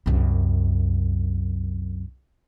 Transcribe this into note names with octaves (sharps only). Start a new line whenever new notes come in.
C2 F#2